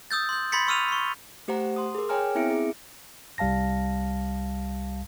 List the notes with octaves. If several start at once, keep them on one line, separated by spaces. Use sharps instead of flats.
D#6 E6 G6 A6
C6 G6
B5 C6 G#6 A6 B6 C#7
C#6 E6 F6 D#7 F7
C6 C#6
A3 G4 C5 F#5 A#5
C6 D#6
G#4 A#4
G#4 C#5 G5 G#5 A#5 F6
B3 C4 E4 E5 C#7 D7
G#4
C2 G3 F5 A5 A#6